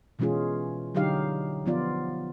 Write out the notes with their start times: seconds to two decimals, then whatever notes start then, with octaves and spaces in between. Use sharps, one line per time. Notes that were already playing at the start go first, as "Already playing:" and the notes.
0.19 B2 E3 G#3 C#4 F4 G#4
0.95 D3 F#3 D#4 G4 F5
1.66 F3 B3 F4 D5